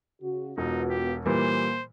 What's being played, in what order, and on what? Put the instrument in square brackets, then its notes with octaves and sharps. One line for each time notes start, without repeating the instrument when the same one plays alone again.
[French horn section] C#3 F#4
[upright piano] E1 [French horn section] B3 F4 F#4 [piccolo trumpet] D#4
[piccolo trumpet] G4
[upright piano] A#2 E3 G3 [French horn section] A#3 [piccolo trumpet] C5